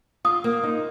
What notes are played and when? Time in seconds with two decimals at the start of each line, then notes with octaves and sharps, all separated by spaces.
0.25 F4 D#6
0.44 A#3
0.64 D#4